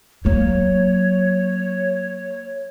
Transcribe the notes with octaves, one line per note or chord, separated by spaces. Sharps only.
F#3 A#3 C#5